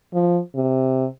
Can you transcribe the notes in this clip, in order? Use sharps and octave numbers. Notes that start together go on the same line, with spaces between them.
F3
C3